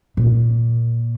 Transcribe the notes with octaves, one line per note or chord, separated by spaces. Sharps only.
A#2